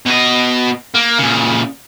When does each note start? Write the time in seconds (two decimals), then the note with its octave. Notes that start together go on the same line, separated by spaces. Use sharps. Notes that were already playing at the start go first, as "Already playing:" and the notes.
0.06 B2 D#5
0.94 A#3
1.18 A#2 C#3